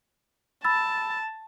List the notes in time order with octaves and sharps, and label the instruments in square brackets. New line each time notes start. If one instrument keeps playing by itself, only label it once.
[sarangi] A5 [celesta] B5 E6 A6